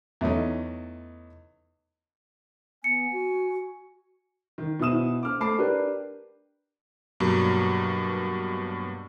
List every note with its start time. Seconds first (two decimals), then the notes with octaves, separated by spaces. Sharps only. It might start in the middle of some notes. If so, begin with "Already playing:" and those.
0.21 E2 A3 C#4 D#4
2.84 B3 G#5 C#7
3.12 F#4
4.58 D#3
4.80 B2 E4 D#6 E7
5.23 D6 F6
5.40 A3 A5 B5 D6 C7
5.58 D4 G4 A#4 B4
7.20 G2 B2 F#3 A#3